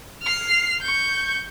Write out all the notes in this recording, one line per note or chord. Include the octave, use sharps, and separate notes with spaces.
F6 C7
C#6 G6